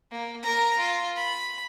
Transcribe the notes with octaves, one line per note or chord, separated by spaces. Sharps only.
A#3
A#4 A#5
F4
B5